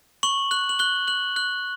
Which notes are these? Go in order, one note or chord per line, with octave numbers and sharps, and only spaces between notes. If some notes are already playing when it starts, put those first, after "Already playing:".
C#6 F#7
F#6 F#7
F#7
F#6 G7
F#6 F#7
F#6